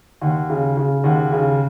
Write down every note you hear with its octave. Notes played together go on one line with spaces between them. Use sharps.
D#2 F#5
C#3
C#3
D#2 F#5
C#3